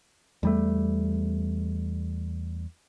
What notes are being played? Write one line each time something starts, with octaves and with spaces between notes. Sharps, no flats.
E2 G3 A3